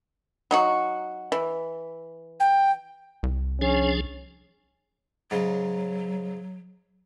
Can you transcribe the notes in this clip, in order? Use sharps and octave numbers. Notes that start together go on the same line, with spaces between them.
F#3 D#4 F#4
E3
G5
C2
F3 C#4 D4 G#4
G#2 C#3 F#3